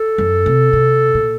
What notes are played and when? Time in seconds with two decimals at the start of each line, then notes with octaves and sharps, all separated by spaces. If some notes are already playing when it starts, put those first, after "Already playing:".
Already playing: A4
0.18 F#2
0.46 C3
0.73 C3
1.14 A#2